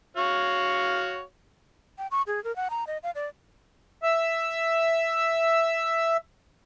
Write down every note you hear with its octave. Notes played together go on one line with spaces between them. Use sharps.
F#4 C#5 F5
G5
C#6
G#4
A#4
F#5
A#5
D#5
F5
D5
E5 E6